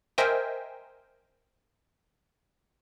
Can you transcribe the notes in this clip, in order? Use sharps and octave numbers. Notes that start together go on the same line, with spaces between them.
A#4 C5 D#5 E5 G5 G#5